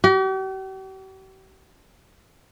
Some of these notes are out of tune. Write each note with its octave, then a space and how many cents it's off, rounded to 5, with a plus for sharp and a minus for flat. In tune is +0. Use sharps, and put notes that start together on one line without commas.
G4 -45